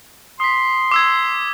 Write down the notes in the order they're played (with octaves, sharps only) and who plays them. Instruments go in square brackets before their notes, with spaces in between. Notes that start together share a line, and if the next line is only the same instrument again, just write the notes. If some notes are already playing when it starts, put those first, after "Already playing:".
[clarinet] C6 [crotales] D#6 B6
[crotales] D6 E6 G#6